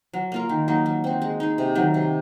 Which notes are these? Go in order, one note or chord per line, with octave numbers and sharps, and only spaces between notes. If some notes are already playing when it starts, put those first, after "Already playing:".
F#3
A#3 F4 A#4
D#3
F#3 A#3 D#4
F#3
C4 F#4
G#3
D#4 G#4
C3
D#3 F#3
C3